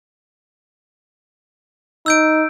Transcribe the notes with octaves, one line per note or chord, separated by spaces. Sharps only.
D#4 E6 G6 D7